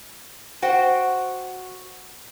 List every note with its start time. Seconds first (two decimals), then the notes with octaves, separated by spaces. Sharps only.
0.62 F#4 C5 F#5 G5